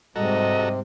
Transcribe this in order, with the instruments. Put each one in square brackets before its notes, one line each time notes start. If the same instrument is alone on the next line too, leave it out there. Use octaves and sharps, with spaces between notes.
[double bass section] G#2 G3 G#3 [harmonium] C3 [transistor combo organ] F#4 A4 A#5 [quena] D#5